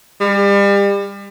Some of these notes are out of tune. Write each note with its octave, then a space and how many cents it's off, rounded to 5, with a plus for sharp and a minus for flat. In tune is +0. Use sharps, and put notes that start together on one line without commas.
G3 +35